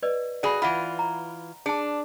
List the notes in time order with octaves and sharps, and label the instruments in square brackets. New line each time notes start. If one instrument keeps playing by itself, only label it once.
[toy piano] B4 D5 D#5
[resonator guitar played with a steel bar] F#4 G#4 [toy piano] D5 B5
[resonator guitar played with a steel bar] E3 F4 [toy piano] E5 F#5 B5
[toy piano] A#5
[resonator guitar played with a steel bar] D4 [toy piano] G#4 A5